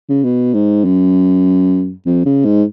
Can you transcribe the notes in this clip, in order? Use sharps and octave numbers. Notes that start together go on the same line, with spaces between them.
C#3
B2
G#2
F#2
F2
C#3
G#2